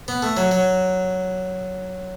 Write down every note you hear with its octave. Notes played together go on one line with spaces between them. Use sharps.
B3
A3
F#3
F#3